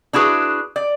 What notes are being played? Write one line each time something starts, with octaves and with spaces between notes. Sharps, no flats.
D4 E4 F#4 G#4 B4
D5